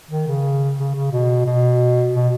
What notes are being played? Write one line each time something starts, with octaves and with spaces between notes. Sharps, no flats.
D#3
C#3
C#3
C#3
B2
B2
B2